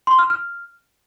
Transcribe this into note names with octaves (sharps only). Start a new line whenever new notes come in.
C6
F6
F6